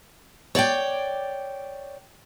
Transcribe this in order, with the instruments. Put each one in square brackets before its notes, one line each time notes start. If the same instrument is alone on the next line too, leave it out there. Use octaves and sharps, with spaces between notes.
[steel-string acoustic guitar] C#5 D5 F#5 G5